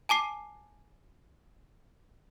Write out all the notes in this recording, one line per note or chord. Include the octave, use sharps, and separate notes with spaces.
G#5 A5 D6 C7